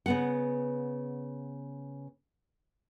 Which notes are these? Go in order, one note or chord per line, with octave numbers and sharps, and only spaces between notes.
C#3 B3 F#5